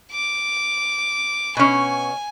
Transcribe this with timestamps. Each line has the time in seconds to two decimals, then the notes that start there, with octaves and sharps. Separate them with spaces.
0.12 D6
1.57 B2 C#4 G#5